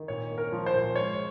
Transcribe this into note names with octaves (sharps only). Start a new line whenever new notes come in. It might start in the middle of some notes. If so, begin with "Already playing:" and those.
Already playing: D#3
A#2 C#5
A#3
A#4
F3
C5
A#2
G#3 C#5